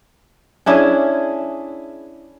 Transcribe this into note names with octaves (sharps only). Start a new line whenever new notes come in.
C#4 D4 E4 G#4